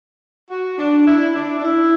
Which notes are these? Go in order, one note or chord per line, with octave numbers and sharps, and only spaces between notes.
F#4
D4
E4
D4
D4
E4